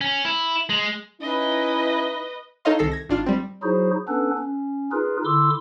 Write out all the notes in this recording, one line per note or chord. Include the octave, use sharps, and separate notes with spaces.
C#4
E4
G#3
C#4 D#4 E4 B4 D#5
D#4 A4 C#5 D#5 F5 C6
C2 D#3 A4 A#6 C7
G#6 A#6
G#1 D4 F4 F6
G3 C4
F#3 D#4 E4 F#4 G#4 C5
B3 C#4 D4 A4 B4
C#4
D#4 F4 G#4 A#4 B4
D3 E4 C6 D6 E6